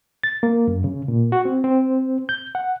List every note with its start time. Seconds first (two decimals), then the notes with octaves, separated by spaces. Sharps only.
0.23 A6
0.43 A#3
0.68 F#2
0.84 C#3
1.08 A#2
1.32 F#4
1.45 C4
1.64 C4
2.29 G6
2.55 F#5